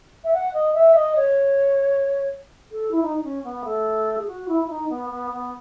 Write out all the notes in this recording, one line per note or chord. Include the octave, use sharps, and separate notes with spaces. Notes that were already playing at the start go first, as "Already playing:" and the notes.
E5
F#5
D#5
E5
D#5
C#5
A4
E4
D#4
D#4
C#4
B3
A3
G#4
F#4
E4
E4
D#4
B3
B3
B3